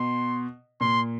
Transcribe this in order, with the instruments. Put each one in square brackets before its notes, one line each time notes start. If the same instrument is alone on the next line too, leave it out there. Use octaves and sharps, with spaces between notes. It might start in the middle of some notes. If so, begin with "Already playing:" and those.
Already playing: [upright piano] B2 [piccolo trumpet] C6
[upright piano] A#2 [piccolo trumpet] C6